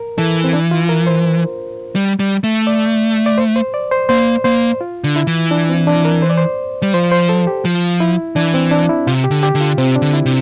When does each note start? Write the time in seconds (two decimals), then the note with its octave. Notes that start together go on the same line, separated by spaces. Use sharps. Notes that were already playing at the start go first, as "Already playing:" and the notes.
Already playing: A#4
0.18 E3 A4
0.44 C4
0.53 D4
0.71 F4
0.89 A#4
1.07 C5
1.95 G3
2.19 G3
2.44 A3
2.67 D5
3.26 D5
3.38 C5
3.56 C5
3.74 D5
3.91 C5
4.09 A#3 C5
4.44 A#3 C5
4.81 F4
5.04 D3
5.16 E4
5.27 E3
5.51 D4
5.69 C4
5.87 D4
6.05 A#4
6.22 C5
6.30 D5
6.37 C5
6.82 G3
6.94 F3 C5
7.12 C5
7.29 A4
7.47 G4
7.65 F3
8.00 E4
8.36 E3 D4
8.54 C4
8.71 D4
8.89 E4
9.07 C3 F4
9.24 G4
9.31 D3
9.43 G4
9.55 D3
9.61 F4
9.78 C3 C4
9.96 D4
10.02 D3
10.14 E4
10.26 C3